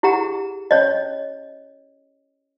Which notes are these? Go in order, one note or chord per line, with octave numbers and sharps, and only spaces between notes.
E4 G4 G#4 F#5 A#5
C#4 C#5 D#5